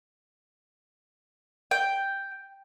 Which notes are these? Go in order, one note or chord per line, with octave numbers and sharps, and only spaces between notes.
G5